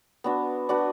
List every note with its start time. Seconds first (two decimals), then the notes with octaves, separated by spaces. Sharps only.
0.24 B3 D4 F#4
0.69 D4 F#4 B4